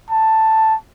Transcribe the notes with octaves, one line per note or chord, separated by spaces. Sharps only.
A5